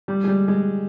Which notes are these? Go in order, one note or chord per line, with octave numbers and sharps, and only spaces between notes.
G3
G#3
G3
G#3